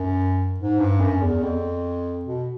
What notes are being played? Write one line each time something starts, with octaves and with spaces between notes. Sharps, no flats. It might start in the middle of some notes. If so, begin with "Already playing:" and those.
Already playing: F#2
G#2
G2
F#2
E2
F2
B2